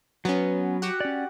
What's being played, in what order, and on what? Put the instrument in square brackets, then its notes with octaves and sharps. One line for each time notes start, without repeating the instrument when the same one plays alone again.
[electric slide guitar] F#3 [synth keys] B3 C#4
[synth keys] F#4 G4 F#5
[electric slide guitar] C#4 D5